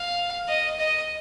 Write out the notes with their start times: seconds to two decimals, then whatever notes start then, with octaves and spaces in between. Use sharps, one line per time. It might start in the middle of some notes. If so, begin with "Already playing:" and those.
Already playing: F5
0.48 D#5
0.79 D#5